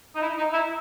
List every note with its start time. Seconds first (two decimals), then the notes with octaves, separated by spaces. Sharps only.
0.15 D#4
0.21 E4
0.37 D#4
0.53 E4